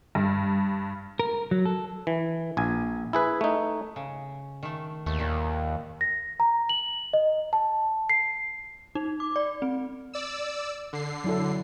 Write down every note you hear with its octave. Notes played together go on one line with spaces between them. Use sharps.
G2
A#4
F#3
A4
E3
A#1 G#5
E4 G#4 B4
A3 D#4
C#3
D#3 A3
D#2 A3
A#2 D#3
A#6
A#5
F#7
D#5
A5
C7
D#4
D6
D5
C4
D5 E6
D3 C7
F#3 E4 A4